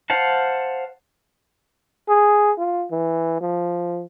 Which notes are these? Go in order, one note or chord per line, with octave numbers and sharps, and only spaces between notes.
C5 F5 F#5 A5
G#4
F4
E3
F3